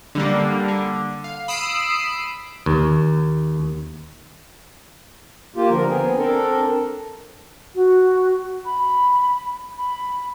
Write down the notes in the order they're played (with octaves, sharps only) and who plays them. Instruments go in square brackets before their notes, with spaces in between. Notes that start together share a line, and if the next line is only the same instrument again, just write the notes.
[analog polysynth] D3 G3 A#3
D3
F5
B5 D#6 E6 C7 D7
[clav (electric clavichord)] D#2
[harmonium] A#3 F4 G4
D3 F3 A#4
B3 C4 G#4
C4 D4 A4 A#4
[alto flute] F#4
B5
B5